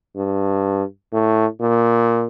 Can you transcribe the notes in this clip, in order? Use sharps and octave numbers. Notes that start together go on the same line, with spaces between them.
G2
A2
A#2